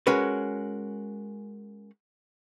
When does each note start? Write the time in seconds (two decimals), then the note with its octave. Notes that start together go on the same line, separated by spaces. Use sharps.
0.07 G#3 C#4 F#4 A#4 B4